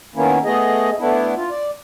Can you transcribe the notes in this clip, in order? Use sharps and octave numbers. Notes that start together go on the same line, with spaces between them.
D#3 A#3 B3 C#4 E4
A3 B3 G#4 D#5
A3 B3 D4 E4
F4
D5